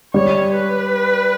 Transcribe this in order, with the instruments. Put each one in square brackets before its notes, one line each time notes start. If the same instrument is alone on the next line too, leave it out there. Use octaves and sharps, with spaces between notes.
[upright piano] G3 [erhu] C#5
[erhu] B4